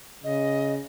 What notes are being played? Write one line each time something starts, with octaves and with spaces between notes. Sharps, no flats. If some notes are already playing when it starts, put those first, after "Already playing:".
C#3 D#5